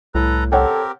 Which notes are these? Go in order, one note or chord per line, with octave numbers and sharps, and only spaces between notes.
C2 A2 A4 B4 A#5
C4 G4 A4 A#4 C#5 F#5 G5